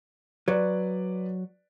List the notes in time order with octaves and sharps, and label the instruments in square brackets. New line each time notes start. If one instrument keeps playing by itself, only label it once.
[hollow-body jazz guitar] F#3 [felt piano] B4 D5